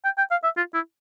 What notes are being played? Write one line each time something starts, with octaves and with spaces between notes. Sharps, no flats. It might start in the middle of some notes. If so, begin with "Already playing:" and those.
G5
G5
F5
E5
F4
E4